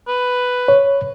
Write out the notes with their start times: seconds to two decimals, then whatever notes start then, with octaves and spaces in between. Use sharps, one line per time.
0.08 B4
0.68 C#5